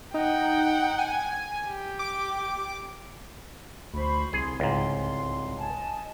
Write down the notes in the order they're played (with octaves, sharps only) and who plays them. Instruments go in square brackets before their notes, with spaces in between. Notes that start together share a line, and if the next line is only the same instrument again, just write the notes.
[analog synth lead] D#4 [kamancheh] F#5 G5
[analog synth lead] G#5
[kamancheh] G4
[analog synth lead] D6
[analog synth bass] D2 [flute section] C5 B5 C#6
[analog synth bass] C2 [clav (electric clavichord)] G#4 [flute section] C6
[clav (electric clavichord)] C#2 G#2
[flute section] D#5 G#5 A5